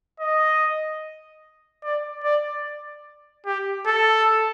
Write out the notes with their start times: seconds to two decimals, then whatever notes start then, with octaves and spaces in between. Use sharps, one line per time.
0.20 D#5
1.84 D5
2.24 D5
3.46 G4
3.86 A4